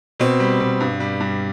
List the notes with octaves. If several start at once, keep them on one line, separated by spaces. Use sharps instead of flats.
B2 C4
G3
B2
G2
G3
G2